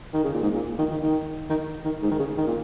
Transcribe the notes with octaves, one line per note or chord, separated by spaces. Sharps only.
D#3
C#3
A#2
G#2
A#2
D#3
D#3
D#3
D#3
D#3
G#2
D#3
C#3
D#3
A#2